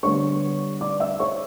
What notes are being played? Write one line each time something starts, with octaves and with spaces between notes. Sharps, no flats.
D3 G3 B3 C#5 C#6
D5 D6
E5 E6
C#5 C#6